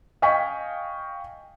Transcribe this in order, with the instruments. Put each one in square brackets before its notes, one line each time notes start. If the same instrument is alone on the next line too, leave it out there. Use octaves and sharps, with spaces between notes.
[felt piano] D#5 F5 G5 G#5 C#6 B6